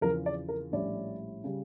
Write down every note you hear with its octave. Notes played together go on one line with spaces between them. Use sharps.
E2 C#3 F3 A#4
D5
A#4
A#1 A2 G3 C#4 E4 D5
C#3 G3